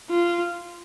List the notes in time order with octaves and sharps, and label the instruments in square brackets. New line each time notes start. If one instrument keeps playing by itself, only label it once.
[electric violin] F4